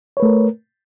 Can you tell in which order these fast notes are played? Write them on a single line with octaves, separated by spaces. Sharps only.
C#5 B4 A3 A#4